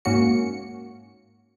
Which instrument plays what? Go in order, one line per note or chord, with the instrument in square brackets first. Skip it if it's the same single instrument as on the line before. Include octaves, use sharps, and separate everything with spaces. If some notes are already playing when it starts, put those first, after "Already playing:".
[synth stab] G#2 A#3 C#4 F#4 C#7